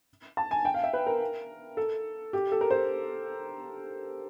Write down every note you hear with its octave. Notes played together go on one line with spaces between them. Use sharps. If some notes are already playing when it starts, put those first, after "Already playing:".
A5
G#5
G5
F5
E5
B4
A#4
A4
G4
A4
A#4
C5